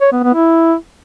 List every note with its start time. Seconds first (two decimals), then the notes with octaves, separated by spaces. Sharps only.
0.01 C#5
0.12 B3
0.23 B3
0.34 E4